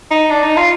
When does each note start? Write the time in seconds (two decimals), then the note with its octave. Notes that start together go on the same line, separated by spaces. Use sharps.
0.11 D#4
0.30 D4
0.43 D#4
0.57 F4